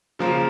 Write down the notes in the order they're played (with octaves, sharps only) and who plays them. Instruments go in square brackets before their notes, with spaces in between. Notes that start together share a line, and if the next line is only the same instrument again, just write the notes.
[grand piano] C#3 F3 A#3 F4 A#4